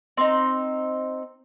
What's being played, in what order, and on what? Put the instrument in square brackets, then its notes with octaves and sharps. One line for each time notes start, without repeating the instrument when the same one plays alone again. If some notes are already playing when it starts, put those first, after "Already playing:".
[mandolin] C4 D#4